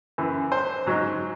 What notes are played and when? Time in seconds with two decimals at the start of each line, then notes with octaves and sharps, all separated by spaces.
0.18 F#2 E3
0.52 C5
0.86 G#2 F#3